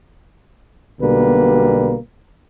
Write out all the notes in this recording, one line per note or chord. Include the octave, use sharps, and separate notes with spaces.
B1 B2 D3 G3 A#3 B4